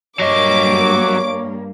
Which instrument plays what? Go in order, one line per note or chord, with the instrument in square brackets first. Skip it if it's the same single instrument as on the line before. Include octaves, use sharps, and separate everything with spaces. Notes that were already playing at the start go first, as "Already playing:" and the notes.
[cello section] G2 A#3 [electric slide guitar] F#3 D#5 [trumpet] C#5 [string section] D6